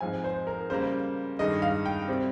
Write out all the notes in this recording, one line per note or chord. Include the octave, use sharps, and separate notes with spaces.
G#2 F3 C4 G#5
C5
A#4
C#3 G3 A#3 C5
G2 D#3 G#3 D#5
F5
G5
C3 G3 C4